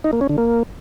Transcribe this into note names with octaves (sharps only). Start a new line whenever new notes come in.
D#4
A#3
C#4
D3
A#3